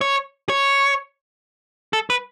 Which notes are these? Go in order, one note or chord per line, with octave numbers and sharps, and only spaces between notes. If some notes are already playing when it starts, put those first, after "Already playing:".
C#5
C#5
A4
B4